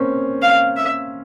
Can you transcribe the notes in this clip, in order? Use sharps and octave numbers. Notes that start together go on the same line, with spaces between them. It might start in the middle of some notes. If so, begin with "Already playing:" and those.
Already playing: A#3 C4 C#4
F5
E5